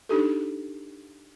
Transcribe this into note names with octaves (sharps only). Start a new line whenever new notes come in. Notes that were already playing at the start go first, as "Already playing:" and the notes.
D4 D#4 G4 A4